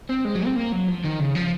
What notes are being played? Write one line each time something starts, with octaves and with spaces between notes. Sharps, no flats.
C4
G#3
F#3
C4
A#3
F#3
F3
D#3
C#3
F3